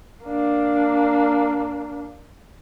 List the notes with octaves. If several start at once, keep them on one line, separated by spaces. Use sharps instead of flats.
A#3 D4